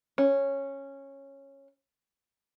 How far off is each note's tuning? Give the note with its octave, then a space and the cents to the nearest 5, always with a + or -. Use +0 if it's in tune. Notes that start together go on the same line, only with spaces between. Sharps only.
C#4 -10